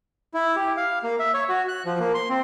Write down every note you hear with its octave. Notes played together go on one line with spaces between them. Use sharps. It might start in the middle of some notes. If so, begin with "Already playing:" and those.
E4
G4
F5
A#3
E5
C#5
F#4
F#6
F3
A#3
C6
C4